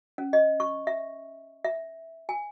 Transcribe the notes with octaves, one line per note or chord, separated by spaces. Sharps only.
C#4
D#5
C#6
E5
E5
G#5